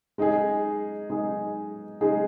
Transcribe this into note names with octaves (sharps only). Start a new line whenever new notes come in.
G#3 D#4 G#4
G#3 D#4 G#4
G#3 D#4 G#4